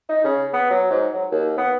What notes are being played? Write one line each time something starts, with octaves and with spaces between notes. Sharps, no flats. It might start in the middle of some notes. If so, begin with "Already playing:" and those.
D#4
C#3
B3
F#3
G#2
F#3
D#2
B3